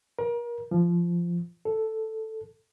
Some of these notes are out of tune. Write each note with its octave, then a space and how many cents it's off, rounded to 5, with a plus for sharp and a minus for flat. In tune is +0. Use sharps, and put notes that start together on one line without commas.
A#4 +35
F3 -15
A4 +0